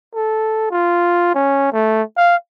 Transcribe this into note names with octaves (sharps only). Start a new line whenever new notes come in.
A4
F4
C#4
A3
F5